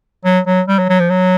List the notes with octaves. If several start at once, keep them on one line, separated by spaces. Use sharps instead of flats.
F#3
F#3
G3
F#3
F#3
F3
F#3